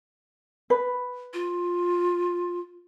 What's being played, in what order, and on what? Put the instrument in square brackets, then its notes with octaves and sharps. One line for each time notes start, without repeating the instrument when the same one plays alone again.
[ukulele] B4
[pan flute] F4